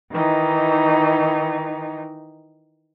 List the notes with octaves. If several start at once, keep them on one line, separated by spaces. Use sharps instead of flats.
D#3 E3 D#4